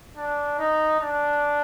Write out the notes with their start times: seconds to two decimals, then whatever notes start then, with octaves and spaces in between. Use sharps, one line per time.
0.17 D4
0.59 D#4
1.01 D4